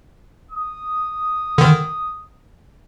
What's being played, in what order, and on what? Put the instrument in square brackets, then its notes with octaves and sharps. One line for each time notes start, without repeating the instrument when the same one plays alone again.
[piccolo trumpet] D#6
[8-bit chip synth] D3 D#3